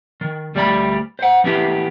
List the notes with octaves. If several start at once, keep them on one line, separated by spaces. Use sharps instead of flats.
D#3
D2 G3 A3 D5 A5 B5
C5 F#5
E3 B3 C#4 E4 G4